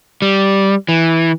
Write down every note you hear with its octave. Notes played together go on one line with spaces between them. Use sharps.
G3
E3